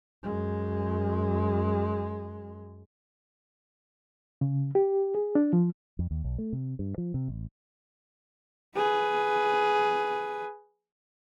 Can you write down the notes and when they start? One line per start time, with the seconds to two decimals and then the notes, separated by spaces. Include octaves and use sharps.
0.23 F#2 G#3
4.41 C#3
4.75 G4
5.15 G#4
5.35 D4
5.53 F3
5.99 F2
6.11 D#2
6.24 B1
6.38 A3
6.53 C3
6.79 G2
6.98 F3
7.14 C3
7.28 A1
8.76 G#4 B4